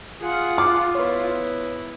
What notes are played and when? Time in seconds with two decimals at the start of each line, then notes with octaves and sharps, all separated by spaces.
0.20 F4 G#4 F#5
0.58 D6
0.95 B3 E4 B4 C#5